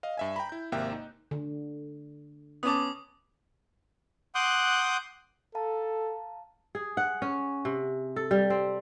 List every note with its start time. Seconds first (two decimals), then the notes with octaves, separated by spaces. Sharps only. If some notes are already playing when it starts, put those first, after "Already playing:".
0.03 D#5 F5
0.17 G2 E5 G#5
0.36 G5 A#5 B5
0.49 E4 G6
0.72 G#1 C3 A#3 E5 G5 F#6
0.93 D#4
1.31 D3
2.63 B3 C#4 A5 D6 D#6
4.35 F#5 C6 D6 D#6 F#6 G6
5.55 A4 F5 A5 A#5
6.75 G#4
6.97 F#5
7.22 C#4
7.65 C3
8.16 A4
8.31 G3
8.50 C4